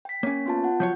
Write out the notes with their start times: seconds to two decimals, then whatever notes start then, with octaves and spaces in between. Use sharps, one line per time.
0.05 G5 B6
0.23 A#3 C#4 C#5
0.46 B3 F4 A5
0.64 F4 F#5
0.80 F3 F#3 C#5 G6